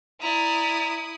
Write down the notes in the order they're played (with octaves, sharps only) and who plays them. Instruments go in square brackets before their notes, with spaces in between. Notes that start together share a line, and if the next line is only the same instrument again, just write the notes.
[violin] E4 D#6 [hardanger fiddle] D5 A#5